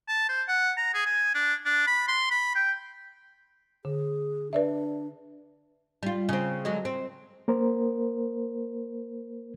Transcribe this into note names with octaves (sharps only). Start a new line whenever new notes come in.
A5
C5
F#5
A#5
G#4
G#5
D4
D4
B5
C6
B5
G5
D3 G#4
D4 B4 D5 E5
G3 F4
C#3 C4
D3 F#3 G#3
C4
A#3 A#4 C5